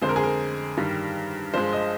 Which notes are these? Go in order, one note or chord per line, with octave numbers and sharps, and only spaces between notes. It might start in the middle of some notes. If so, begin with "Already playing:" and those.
F2 D3 G#3 C5
A#4
G#4
A#4
G2 D#3 G3
G2 F3 G#3 C5
D#5